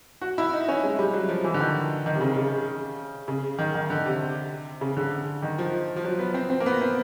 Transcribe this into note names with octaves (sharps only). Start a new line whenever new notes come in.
F#4
E4
D#4
C#4
G#3
G3
F#3
F3
E3
D3
D#3
D#3
C3
C#3
C#3
C#3
D#3
D#3
D3
C3
C#3
D3
D#3
F3
F3
F#3
B3
C4
C4
A#3
B3
C4